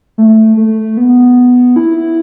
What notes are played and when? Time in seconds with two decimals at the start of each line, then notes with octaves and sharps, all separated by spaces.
0.18 A3
0.57 A3
0.97 B3
1.76 E4